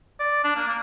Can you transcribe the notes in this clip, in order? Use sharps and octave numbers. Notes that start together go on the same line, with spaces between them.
D5
D4
A#3
A#3